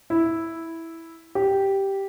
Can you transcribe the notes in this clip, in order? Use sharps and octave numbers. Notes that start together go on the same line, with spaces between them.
E4
G4